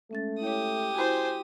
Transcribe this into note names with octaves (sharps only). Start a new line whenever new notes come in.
G#3 A3 C#4 A6
E4 G4 C#5 D#6
E4 F#4 C5 G#5